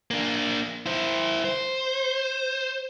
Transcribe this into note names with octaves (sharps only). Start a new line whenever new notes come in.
A#3 D4
E4 C5
C5